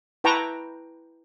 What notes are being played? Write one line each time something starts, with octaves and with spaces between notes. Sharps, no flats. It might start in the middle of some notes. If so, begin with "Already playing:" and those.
E4 B4 G5 A5 A#5 C#6